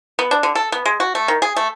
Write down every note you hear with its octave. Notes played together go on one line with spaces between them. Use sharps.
B3
D4
D3
A4
B3
G#3
F#4
A3
D#3
G#4
A3